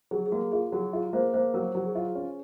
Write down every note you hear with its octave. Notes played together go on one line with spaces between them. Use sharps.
F#3 G#4
G#4
A#3 F#4
F4 G#4
F#3 F#4
F4 G#4
A#3 C5
A#3 C5
F#3 A#4
F#3
G#4
F4
C#4